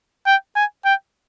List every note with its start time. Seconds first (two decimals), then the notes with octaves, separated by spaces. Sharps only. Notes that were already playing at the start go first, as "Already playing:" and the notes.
0.26 G5
0.56 G#5
0.85 G5